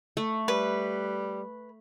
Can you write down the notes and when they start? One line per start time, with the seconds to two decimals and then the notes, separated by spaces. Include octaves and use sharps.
0.17 A3
0.48 G3 B4